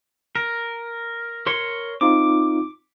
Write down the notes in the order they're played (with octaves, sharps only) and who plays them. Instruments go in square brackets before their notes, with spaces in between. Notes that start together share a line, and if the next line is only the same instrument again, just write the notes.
[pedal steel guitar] A#4
A#4 C#5 C6
[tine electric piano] C4 D#4 F4 [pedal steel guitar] D6